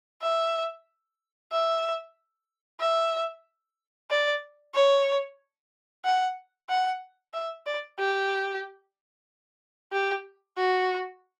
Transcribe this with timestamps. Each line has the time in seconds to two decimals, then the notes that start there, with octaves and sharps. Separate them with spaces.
0.22 E5
1.52 E5
2.80 E5
4.10 D5
4.75 C#5
6.05 F#5
6.69 F#5
7.34 E5
7.66 D5
7.98 G4
9.93 G4
10.57 F#4